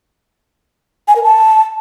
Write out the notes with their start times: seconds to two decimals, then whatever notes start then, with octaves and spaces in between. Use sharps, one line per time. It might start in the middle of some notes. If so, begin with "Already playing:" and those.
1.08 G#5
1.16 A#4
1.24 A5